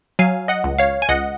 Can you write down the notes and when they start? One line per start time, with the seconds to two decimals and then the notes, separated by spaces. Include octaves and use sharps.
0.19 F#3 F5 G#5
0.48 D#5 F#5
0.64 C#2
0.79 C#5 F5
1.02 G#5
1.09 C#2 D#5 F#5